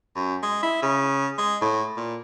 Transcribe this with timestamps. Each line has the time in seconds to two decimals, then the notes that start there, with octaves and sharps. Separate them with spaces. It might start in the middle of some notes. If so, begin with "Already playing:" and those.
0.16 F#2
0.43 G#3
0.63 E4
0.82 C#3
1.38 G#3
1.61 A2
1.97 A#2